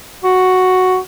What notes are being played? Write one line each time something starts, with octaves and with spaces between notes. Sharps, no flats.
F#4